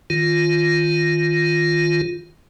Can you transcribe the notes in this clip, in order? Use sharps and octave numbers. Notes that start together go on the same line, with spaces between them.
D#3 F4